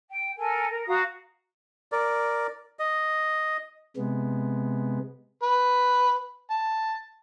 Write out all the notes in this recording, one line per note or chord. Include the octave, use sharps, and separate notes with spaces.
G5
A4 A#4 G#5
A#4
F#4 F5 A#5 D#6
A#4 D5
D#5
C3 G#3 B3
B4
A5